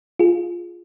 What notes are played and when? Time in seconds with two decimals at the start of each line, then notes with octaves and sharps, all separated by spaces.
0.19 F4 G#4